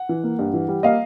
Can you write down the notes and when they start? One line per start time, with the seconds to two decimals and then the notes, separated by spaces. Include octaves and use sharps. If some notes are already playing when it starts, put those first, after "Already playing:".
Already playing: F#5
0.09 E3
0.24 A#3
0.39 G2
0.54 E3
0.69 G3
0.83 A#3 D#5 F5